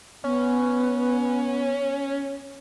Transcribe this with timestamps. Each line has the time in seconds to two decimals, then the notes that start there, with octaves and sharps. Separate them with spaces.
0.24 B3 C#4